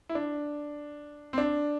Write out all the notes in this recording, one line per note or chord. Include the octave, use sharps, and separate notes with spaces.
E4
D4
C4
D4